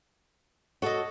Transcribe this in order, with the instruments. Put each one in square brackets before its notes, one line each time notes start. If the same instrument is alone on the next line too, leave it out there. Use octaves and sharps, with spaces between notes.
[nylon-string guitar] F#4 A4 [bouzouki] C#5 D#5